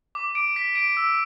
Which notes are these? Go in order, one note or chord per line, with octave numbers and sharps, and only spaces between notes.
D6
D7
B6
D7
E6